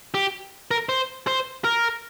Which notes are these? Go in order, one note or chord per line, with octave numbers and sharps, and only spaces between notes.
G4
A#4
C5
C5
A#4